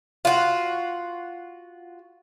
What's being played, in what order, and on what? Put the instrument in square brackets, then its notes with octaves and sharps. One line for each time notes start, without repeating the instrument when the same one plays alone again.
[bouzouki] F4 F#4